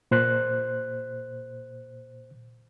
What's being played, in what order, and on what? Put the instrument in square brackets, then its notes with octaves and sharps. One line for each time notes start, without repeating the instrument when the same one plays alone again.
[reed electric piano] A#2 C5 F#6